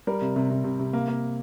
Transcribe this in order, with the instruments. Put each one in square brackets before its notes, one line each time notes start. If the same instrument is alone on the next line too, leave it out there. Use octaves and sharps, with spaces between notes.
[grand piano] G3 A#4
C3
C3
C3
C3
C3
A#3
A#3